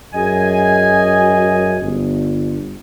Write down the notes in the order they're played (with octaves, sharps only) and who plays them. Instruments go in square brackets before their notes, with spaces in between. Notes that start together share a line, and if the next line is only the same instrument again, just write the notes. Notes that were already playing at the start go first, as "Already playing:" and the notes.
[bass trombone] F#2 [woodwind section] G#4 D#5 G#5
[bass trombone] G1